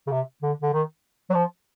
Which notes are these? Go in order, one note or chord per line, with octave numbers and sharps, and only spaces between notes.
C#3
C3
D3
D3
D#3
F#3
F3